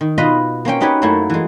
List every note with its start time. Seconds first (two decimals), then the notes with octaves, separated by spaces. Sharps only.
0.01 D#3
0.18 B2 F4 B4 D#5 B5
0.65 A#3 C4 C#4 G5
0.80 D#4 F#4 G4 B4 C#5
1.02 F#2 A3 A#3 E4 C#5
1.30 E3 G#3